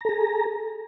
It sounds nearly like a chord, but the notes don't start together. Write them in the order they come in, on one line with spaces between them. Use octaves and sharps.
A#5 A4 G#4